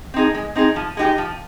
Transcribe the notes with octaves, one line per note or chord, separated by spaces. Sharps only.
C4 D#4 G#4
G#3
C4 D#4 G#4
F3
G#3 D#4 G4
F3